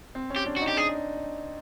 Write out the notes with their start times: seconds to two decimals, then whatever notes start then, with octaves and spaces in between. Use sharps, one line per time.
0.15 C4
0.30 C#4
0.36 G4
0.46 D4
0.57 F#4
0.62 D#4
0.68 G4
0.77 D4 G#4